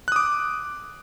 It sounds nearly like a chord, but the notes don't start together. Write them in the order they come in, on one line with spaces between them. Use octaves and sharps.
F#6 D#6 D6